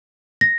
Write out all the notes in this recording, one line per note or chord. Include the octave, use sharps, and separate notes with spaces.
A#6